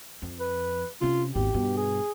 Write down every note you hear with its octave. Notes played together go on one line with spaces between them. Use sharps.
F2
B4
C3 C#4 F4
G#1 E2 G4
G2 B2
G#4